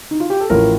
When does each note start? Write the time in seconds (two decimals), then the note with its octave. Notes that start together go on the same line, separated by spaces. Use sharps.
0.11 D#4
0.20 F4
0.30 G4
0.41 A4
0.50 A1 A2 F3 A#4